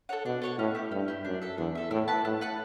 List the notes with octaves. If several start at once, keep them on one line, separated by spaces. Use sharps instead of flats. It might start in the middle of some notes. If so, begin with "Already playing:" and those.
A4 C#5 F#5
B2 D4
A4 C#5 F#5
A2 C#4
E4 G4
G2 C#4
E4 G4
F#2 D4
A4 E5
E2 D4
A4 E5
A2 E4
B4 F#5 A5
A2 E4
B4 F#5 A5